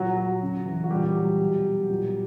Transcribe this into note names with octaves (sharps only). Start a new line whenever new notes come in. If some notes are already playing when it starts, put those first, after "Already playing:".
Already playing: A#2 F#3 F#4
F#3
C#3
E3
F#4
A#2 G3 G4
F#3
B2
F#3
A#2